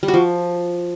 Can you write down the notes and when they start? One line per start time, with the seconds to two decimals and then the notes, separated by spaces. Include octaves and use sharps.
0.03 G3
0.08 F#4
0.14 F3